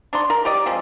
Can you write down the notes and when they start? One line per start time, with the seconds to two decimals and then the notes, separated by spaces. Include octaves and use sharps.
0.13 D4 D#4 D5 C6
0.30 A#4
0.45 G4 D5 D#5
0.66 F3 G#3 C4